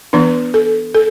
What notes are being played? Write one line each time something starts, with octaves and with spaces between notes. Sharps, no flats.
E3 B3 D4 B4
A4
A4